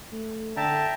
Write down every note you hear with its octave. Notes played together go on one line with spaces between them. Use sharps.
A3
D3 E5 G5 A5 A#5